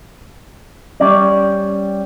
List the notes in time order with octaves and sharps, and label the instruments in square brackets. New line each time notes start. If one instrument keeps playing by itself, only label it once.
[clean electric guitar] G3 C#4 D5